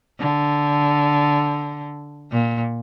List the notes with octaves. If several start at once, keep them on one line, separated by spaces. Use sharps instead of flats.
D3
A#2